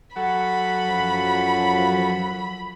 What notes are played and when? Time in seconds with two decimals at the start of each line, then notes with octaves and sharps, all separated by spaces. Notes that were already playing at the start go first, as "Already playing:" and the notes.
0.16 F#3 A4 F#5 B5
0.86 F#2 F3